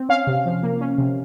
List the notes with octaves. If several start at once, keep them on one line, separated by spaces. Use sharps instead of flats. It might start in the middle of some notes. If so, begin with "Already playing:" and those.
Already playing: C4
C#4 F5
C3
F3
A#3
C#4
C3